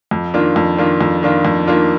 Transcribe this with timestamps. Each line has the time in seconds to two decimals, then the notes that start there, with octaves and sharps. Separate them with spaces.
0.11 F2
0.34 D#3 A#3 D4 F4
0.56 F2
0.78 D#3 A#3 D4 F4
1.01 F2
1.23 D#3 A#3 D4 F4
1.45 F2
1.67 D#3 A#3 D4 F4